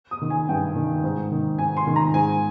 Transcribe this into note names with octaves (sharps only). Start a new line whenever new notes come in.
D#6
D#3
G#5
G2 G5
D#3
G#2
D#3
G#2 G#5
C6
D#3
A#5
G#2 G#5